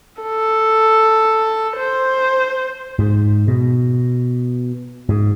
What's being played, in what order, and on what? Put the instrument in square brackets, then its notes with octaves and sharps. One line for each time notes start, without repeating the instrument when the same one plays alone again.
[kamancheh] A4
C5
[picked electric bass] G#2
B2
G#2